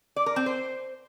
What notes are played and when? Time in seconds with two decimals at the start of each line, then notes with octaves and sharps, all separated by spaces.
0.16 D5
0.26 A#4
0.36 C4
0.46 C5